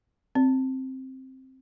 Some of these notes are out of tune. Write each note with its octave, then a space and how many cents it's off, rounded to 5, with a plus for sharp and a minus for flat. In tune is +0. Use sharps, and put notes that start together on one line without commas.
C4 +5